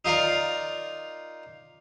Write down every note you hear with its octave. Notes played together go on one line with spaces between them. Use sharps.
D#4 F4 A#4 D5